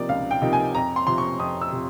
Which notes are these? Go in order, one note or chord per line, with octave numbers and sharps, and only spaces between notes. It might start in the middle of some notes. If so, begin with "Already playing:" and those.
Already playing: C3 F3 A#3 D#4 D5
C#2 F5
G5
C3 F3 A#3 D#4
G#5
F2 A#5
C6
C3 F3 C6
C#6
F2 D#6
E6
C3 F3